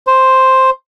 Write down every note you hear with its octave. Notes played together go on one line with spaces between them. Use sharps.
C5